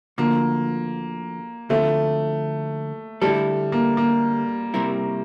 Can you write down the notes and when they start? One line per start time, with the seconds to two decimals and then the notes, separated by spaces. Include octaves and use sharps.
0.18 D2 D3 F3 A#3
1.69 D2 D3 F3 A3 C4
3.21 D3 G3 A3 E4 A4
3.72 A#3
3.97 A#3
4.74 C3 G3 C4 E4 A#4